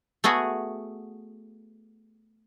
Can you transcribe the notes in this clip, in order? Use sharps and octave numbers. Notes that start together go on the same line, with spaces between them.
A3 B3 F#4 G#4